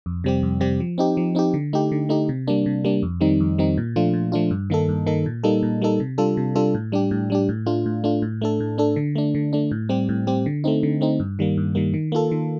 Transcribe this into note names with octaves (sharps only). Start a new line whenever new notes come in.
F2
C3 G3 C4 G4
F2
C3 G3 C4 G4
F3
C4 D#4 G4
F3
C4 D#4 G4
D3
A3 D#4 G4
D3
A3 D#4 G4
C3
G3 A#3 D4
C3
G3 A#3 D4
F2
D#3 G3 C4 D#4
F2
D#3 G3 C4 D#4
A#2
F3 A3 D4 F4
A#2
F3 A3 D4 F4
G2
D#3 A#3 D#4 A4
G2
D#3 A#3 D#4 A4
A#2
G3 A#3 D#4 A4
A#2
G3 A#3 D#4 A4
C3
G3 D4 F4 A4
C3
G3 D4 F4 A4
A2
G3 D4 G4
A2
G3 D4 G4
A2
A3 D4 F4
A2
A3 D4 F4
A2
A3 D4 A4
A2
A3 D4 A4
D3
A3 D4
D3
A3 D4
A2
G3 C4 G4
A2
G3 C4 G4
D3
A3 C4 D#4
D3
A3 C4 D#4
G2
D#3 G3 A#3
G2
D#3 G3 A#3
D#3
A#3 F4 A4
D#3